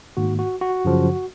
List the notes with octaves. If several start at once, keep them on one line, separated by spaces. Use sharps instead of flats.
G#2 D#3 A#3 F#4
F#4
F#4
F#2 C#3 F3